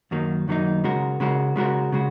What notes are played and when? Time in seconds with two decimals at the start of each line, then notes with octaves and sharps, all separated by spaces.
0.11 F#2 D#3 F#3 A#3 D#4
0.48 F#2 D#3 F#3 A#3 D#4
0.84 C#3 G#3 F#4 A#4
1.20 C#3 G#3 F#4 A#4
1.56 C#3 G#3 F#4 A#4
1.92 C#3 G#3 F#4